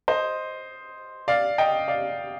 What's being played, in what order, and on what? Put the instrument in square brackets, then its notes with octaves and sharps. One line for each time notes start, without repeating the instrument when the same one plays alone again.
[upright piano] C5 D#5
D5 F5
D#5 G5
D5 F5